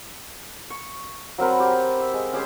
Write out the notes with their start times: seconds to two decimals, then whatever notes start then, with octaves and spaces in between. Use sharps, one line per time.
0.70 C#6
1.38 F#3 C4 A#4 B4
1.60 G4
2.00 E5
2.14 G#3
2.32 C#4 G4 G#4 C5